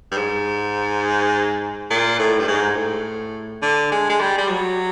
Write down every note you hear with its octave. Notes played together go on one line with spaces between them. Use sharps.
G2
G#2
A#2
A2
G2
G#2
A2
D3
G#3
G#3
G3
G3
F#3